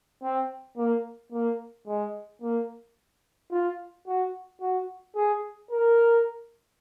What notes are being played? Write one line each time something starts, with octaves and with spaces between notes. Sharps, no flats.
C4
A#3
A#3
G#3
A#3
F4
F#4
F#4
G#4
A#4